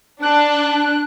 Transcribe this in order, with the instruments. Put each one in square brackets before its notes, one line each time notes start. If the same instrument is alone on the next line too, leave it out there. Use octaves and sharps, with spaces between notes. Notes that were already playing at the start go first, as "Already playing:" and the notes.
[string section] D4 [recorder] F#6